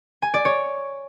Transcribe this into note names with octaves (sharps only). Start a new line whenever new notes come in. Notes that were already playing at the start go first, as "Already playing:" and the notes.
G#5
D5
C#5